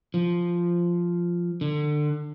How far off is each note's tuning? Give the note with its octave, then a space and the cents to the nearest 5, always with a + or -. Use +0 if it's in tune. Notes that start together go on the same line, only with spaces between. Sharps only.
F3 -5
D3 +25